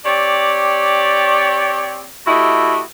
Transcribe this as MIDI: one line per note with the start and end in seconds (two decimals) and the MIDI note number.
0.05 2.06 60
0.05 2.06 67
0.05 2.06 73
0.05 2.06 74
2.27 2.80 57
2.27 2.80 64
2.27 2.80 66
2.27 2.80 67
2.27 2.80 75